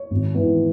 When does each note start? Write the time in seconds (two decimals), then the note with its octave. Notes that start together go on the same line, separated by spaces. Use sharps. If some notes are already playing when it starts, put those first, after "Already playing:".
Already playing: C#5
0.10 G#1
0.35 G#2 E3 B3